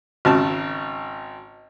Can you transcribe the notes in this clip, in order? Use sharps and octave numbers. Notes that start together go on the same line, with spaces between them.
G#1 C#3 A5